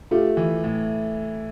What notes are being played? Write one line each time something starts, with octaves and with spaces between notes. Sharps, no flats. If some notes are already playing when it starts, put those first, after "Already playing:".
A3 F4 G4
E3
A2